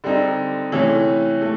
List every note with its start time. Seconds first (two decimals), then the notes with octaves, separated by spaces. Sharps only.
0.04 D3 G3 C4 D#4
0.72 C3 E3 A3 C#4 E4
1.41 A3